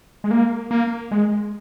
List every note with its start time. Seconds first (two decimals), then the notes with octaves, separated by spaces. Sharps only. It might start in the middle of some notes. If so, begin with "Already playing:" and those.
0.24 G#3
0.31 A#3
0.71 A#3
1.11 G#3